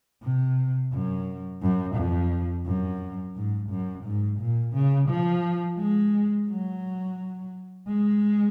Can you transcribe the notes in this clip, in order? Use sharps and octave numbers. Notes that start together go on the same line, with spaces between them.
C3
F#2
F#2
F2
F#2
G#2
F#2
G#2
A#2
C#3
F3
G#3
F#3
G#3